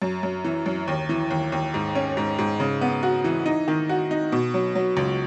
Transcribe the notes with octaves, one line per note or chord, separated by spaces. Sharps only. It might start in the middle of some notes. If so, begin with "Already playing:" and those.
F#2
F#2
E3
F#2
D#2
E3
D#2
D#2
G#2
C#4
G#2
G#2
C#3
B3
F#4
E3
D#4
D#3
F#4
D#4
B2
F#3
F#3
C#2